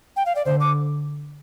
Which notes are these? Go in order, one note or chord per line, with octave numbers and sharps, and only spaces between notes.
G5
F5
D5
D3 C5
D6